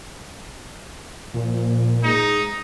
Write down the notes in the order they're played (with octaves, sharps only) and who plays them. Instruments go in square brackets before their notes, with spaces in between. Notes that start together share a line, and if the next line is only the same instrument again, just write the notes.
[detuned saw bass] A#2 [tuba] F3
[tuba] G#2 [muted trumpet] D#4